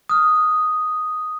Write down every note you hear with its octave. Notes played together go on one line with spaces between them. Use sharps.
D#6 F6